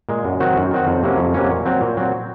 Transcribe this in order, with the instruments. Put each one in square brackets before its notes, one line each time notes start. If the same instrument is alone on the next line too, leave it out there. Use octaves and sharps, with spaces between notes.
[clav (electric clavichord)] A#2 G#3
F#2
D#3 F#3 C4 F#4
F#2
D#3 F#3 C4 F#4
F2
C3 F#3 A#3 C#4
F2
C3 F#3 A#3 C#4
A#2
F#3 C4
A#2
F#3 C4